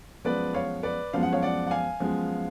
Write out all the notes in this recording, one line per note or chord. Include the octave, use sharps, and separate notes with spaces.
F#2 F3 G#3 B3 B4 D5
C#5 F5
B4 D5
F#2 F3 G#3 B3 F5
F#5
C#5 F5
D5 F#5
F#5
F5 G#5
F#2 F3 G#3 B3